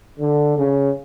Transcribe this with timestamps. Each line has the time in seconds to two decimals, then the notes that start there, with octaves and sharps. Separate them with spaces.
0.19 D3
0.57 C#3